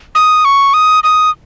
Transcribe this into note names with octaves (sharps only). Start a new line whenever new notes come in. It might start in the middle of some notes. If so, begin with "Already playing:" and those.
D#6
C#6
D#6
D#6